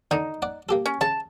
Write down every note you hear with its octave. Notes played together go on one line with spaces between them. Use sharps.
D3 D4 D#4
D5 F#5
A#3 G4 A4
C#4
C#3 A5